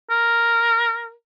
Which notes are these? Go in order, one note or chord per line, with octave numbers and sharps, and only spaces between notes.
A#4